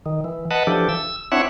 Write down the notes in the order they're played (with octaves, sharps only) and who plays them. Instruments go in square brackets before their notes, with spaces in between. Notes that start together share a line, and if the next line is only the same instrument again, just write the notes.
[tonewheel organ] D#3
E3
B4 D#5 F#5 A5
E3 F3 D4 G4 A4
E6
C4 D4 E4 C#5 E5 F#5